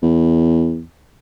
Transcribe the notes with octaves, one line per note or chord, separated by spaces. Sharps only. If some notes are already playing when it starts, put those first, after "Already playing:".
E2